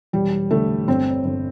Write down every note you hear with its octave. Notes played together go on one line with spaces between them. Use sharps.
E1 G3
D3 A3
G1 C4
G1